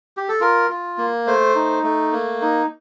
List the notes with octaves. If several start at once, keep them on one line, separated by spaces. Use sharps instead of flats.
G4
A4
F4 A#4
F4
A#3
A3 C5
D#4
A3
A#3
D#4